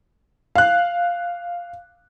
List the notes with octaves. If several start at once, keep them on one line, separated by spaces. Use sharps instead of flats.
F5 F#6